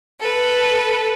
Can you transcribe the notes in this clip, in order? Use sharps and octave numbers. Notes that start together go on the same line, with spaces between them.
A4 B4